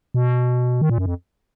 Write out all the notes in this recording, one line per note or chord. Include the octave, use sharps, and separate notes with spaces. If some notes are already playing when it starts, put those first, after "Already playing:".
B2
D#3
A#2
F#2
F2